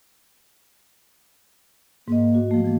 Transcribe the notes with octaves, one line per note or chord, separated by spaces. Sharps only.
G#2 A#3 D#5
F#4
F3 A3 A#3
E3 F3 A#3